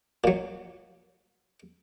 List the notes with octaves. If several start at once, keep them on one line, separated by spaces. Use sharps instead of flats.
A#2 F#3